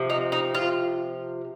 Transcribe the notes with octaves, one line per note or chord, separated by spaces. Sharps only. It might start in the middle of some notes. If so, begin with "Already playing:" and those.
Already playing: C3 F3
D#4
D#4
F4